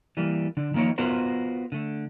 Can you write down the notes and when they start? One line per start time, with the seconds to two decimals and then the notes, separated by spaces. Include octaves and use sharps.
0.17 E3 G3 A#3
0.57 D3 D4
0.74 D#3 F3 A#3 A#4 C#5
0.98 B3 F4 F#4 A#4 C5
1.72 D3 A3